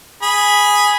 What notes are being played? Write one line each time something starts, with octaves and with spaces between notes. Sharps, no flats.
G#4 B5